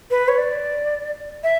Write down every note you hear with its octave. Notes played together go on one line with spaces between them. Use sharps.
B4
C#5
D5
E5